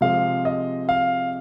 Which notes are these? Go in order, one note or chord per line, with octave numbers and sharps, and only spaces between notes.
C3 F3 G#3 F5
D#5
F5